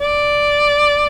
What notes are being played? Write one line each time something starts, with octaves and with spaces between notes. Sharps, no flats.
D5